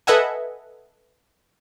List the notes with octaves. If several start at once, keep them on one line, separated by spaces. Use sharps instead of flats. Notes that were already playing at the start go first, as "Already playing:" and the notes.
A4 B4 D#5 E5 F#5 G#5